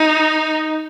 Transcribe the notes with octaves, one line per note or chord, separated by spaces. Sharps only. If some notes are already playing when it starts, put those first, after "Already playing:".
Already playing: D#4